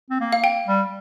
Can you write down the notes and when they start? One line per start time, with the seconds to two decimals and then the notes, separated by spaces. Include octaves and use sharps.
0.10 C4
0.21 A#3
0.33 F5
0.44 G5
0.67 G3